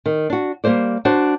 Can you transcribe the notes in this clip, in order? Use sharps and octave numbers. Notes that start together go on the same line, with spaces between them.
D#3
D4 F#4
G3 A#3 A4 C5 D5
D4 F#4 C5